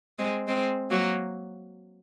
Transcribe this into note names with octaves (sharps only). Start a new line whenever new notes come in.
G#3 C4
G#3 C4
F#3 A#3